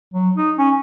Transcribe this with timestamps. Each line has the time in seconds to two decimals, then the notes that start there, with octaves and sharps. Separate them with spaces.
0.13 F#3
0.36 D#4
0.58 C#4